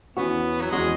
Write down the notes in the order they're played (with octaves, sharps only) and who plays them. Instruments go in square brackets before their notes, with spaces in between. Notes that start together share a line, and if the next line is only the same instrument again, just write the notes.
[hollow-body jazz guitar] E2 E3 C#4 F#4 [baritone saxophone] B3
[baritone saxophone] F#3
[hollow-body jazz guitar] E2 E3 C#4 F#4 [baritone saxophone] G#3